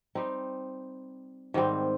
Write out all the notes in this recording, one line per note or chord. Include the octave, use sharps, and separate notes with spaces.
G3 C4 D#4
G#2 D#3 G3 C4